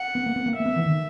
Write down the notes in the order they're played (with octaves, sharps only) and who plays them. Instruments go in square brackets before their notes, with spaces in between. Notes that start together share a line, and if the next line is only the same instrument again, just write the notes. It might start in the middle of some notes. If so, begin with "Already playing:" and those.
Already playing: [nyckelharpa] F#5
[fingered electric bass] B3
A#3
B3
A#3
[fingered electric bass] A#3 [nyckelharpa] E5
[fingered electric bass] B3
E3
D#3